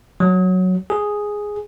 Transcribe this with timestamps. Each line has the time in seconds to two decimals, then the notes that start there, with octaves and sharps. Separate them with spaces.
0.20 F#3
0.90 G#4